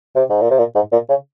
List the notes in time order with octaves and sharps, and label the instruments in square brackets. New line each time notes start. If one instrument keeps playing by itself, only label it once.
[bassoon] C3
G#2
A#2
C3
A#2
G#2
A#2
C#3